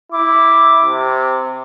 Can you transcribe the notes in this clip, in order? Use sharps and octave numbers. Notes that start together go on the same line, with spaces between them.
E4 D6
C3